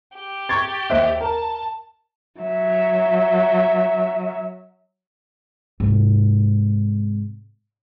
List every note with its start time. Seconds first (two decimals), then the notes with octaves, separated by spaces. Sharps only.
0.15 G4
0.49 C#6 G#6 A6
0.90 D#2 C5 D#5 E5 F#6
1.21 A#4 A5
2.40 F#3 E5
5.80 G#2 C3